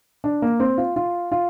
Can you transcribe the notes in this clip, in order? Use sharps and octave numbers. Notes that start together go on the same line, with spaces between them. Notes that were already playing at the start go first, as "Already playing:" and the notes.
D4
A#3
C4
F4
F4
F4